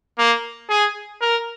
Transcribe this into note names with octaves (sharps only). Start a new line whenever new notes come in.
A#3
G#4
A#4